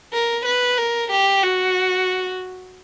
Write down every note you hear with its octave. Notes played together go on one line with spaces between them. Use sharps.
A#4
B4
A#4
G4
F#4